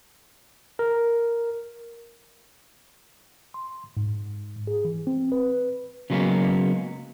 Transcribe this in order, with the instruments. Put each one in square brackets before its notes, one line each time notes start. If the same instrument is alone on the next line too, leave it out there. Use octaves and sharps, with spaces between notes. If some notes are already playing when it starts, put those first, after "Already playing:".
[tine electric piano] A#4
C6
G#2
G#4
E3
C4
B4
[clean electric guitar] C#3 F#3 G#3 A#3 B3 C#4